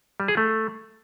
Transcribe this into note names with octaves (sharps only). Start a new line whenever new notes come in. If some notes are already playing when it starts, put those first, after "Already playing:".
G3
G#4
A3